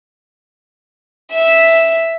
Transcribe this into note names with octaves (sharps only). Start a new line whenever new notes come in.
E5